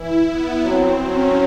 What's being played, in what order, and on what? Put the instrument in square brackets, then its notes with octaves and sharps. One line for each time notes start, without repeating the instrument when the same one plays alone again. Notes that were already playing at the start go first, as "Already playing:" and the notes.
Already playing: [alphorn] E3 [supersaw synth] E4
[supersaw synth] B3
[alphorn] F#3 [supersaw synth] C4
[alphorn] F#3 [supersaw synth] C#4